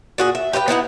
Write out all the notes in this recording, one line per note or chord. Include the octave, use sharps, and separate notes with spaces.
A#2 F#4 G#4
E5
G4 B4 E5 G5
B3 D#4 E4 F#5